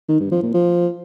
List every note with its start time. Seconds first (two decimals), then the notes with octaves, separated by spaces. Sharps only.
0.09 D#3
0.20 G2
0.31 F3
0.42 A#2
0.54 F3